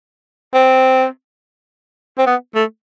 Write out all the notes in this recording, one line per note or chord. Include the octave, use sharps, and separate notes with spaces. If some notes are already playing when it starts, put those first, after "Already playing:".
C4
C4
B3
A3